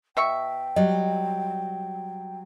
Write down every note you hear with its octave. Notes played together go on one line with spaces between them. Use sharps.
B2 E5 G5 C#6
F#3 G3 D#5